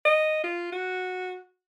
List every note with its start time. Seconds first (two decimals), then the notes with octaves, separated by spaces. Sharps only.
0.05 D#5
0.44 F4
0.72 F#4